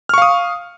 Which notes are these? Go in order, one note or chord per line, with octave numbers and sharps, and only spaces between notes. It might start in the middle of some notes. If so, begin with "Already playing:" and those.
F5 C#6 D#6 F6